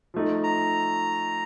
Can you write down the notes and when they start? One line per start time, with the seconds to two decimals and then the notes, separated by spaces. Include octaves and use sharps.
0.14 F3 A3 D#4
0.44 A#5